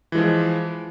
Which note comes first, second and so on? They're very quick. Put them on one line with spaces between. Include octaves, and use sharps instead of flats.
E3 G#3 F3